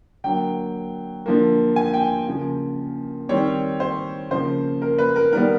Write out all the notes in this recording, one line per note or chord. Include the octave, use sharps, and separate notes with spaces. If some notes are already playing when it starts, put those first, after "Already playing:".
D3 F#3 A#3 G5
D3 F3 A#3
G#5
G5
C#3 F3 A#3
D#3 G3 C4 C#5
C5
C#3 F3 A#3 C5
A#4
B4
A#4
D#3 G3 B3 A#4